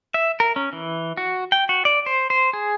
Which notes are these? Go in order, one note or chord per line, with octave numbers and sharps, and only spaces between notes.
E5
A#4
C#4
E3
F#4
G5
F#4
D5
C5
C5
G#4